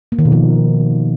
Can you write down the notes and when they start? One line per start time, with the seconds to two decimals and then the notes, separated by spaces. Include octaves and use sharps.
0.12 A#3
0.19 D#3
0.25 B2
0.32 F3